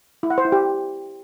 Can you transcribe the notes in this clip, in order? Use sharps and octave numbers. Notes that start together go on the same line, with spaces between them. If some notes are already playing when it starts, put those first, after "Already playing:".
E4
F#5
C5
E4
G4